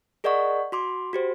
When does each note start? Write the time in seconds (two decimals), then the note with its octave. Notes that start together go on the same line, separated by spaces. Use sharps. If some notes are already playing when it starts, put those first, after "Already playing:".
0.24 G#4 A#4 D5 D#5 F#5 C#6
0.72 F#4 C6 D6
1.13 F#4 G4 C5